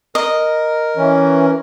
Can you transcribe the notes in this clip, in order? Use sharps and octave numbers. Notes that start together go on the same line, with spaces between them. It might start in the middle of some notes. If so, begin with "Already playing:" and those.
A#4 D#5
E3 C#4